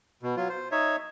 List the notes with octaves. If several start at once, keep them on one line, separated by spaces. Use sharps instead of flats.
B2
F#3 F4
C5
D#4 C#5 E5